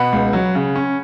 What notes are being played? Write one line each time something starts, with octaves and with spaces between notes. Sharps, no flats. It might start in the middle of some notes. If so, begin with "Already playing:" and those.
Already playing: B2 F#5 B5
C#2
F#3
C#3
C#4